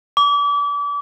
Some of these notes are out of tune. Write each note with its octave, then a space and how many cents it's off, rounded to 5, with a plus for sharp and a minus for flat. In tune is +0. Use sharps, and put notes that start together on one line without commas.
D6 -35